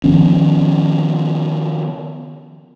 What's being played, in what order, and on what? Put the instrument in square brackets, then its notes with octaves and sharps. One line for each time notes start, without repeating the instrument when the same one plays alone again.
[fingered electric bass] D#3 F3 B3 C#4